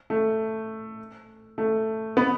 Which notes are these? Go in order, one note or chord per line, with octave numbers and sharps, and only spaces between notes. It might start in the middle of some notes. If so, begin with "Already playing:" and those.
A3
A3
B3